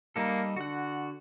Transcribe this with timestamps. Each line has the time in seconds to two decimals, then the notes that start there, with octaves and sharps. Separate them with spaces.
0.16 G3 A#3 D#4 A4
0.57 D3 F#4 F#5